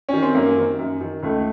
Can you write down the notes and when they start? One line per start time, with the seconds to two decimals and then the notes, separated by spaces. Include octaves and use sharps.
0.09 D#3 C#4
0.22 C4
0.35 F#2 A#3
0.57 D#3
0.79 F#2
1.01 D#3
1.23 C#2 A3